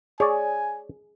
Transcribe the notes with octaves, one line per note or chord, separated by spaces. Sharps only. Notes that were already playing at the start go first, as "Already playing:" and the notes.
G#4 C#5 D5 G#5